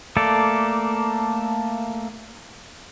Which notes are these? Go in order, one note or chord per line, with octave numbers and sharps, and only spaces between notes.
A3 A#3 A4 D5